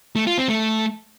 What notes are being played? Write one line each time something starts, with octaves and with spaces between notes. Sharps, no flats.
A3
F4
C4
A3